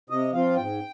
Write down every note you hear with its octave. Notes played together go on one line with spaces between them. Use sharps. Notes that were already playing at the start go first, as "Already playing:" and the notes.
C3 D#5
F3 C4 F4 F5
G#2 G5